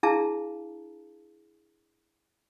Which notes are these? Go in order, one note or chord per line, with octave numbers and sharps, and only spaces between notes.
D4 E4 G#4 F5 A5 A#5